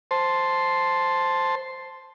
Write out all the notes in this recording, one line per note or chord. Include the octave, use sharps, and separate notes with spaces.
C5 A5 C6